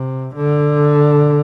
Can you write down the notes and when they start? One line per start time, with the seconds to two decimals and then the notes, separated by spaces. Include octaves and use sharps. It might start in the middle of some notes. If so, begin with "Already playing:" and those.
Already playing: C3
0.36 D3